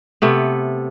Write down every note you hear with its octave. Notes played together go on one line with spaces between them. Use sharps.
C3 A3 B3